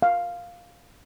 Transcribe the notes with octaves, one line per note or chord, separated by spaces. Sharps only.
F5